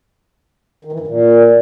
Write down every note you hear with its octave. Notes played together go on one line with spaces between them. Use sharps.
D#3
E3
G2
A#2